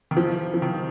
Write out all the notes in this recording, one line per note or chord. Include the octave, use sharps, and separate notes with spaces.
D#3
F3
F3
D#3